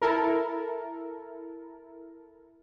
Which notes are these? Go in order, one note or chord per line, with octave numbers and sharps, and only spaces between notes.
E4 A4 A#4